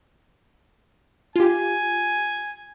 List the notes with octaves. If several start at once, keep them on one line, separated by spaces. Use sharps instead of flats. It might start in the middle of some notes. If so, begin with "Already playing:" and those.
F4 G4 G#5